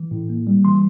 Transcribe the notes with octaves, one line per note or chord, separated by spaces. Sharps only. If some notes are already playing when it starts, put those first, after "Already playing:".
Already playing: E3
A2
A#3
G3
E3 C6